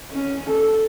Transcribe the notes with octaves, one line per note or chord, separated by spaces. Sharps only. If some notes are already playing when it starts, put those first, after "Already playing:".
C#4
A4